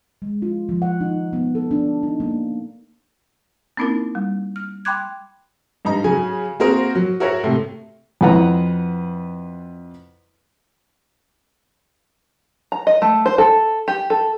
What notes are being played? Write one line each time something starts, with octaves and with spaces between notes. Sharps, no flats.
G#3
F4
F3
F#5
D#4
B3
A4
D4
D#4
A#3
A#3 C4 C#4 D#4 E4 A#4
G3
F6
G5 B5 C6 D6 F#6 G#6
G2 D#4 A#5
C#3 F#3 G#5
A#3 C4 F#4 G#4 A#4 C5
F#3
F#4 A#4 C#5 E5 F#5
A2 C3 A3
F2 E4 B4 F#5 A#5
A#5
D#5
A3
C5
A4
G4
A4